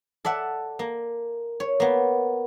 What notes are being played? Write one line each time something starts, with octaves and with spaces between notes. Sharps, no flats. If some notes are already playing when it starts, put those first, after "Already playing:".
A4 D5 E5 F#5
A#3
C#5
A#3 B3